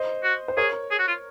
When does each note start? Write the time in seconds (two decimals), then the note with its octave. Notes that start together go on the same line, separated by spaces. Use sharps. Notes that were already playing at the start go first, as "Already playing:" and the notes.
Already playing: C5 D#5
0.23 F#4
0.48 C5
0.57 G#4 A#4 C#5
0.91 G#4
0.99 F#4
1.08 F4